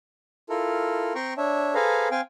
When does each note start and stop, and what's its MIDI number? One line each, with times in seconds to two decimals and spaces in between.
0.49 1.13 64
0.49 1.13 65
0.49 1.13 69
0.49 1.13 70
1.15 1.34 60
1.15 1.34 79
1.15 1.34 82
1.15 1.34 84
1.15 1.34 85
1.37 1.74 62
1.37 1.74 73
1.37 1.74 76
1.75 2.08 68
1.75 2.08 69
1.75 2.08 71
1.75 2.08 72
1.75 2.08 77
1.75 2.08 82
2.11 2.21 60
2.11 2.21 77
2.11 2.21 79
2.11 2.21 80